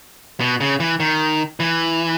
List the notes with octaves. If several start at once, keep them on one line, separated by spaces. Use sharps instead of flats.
B2
C#3
E3
D#3
E3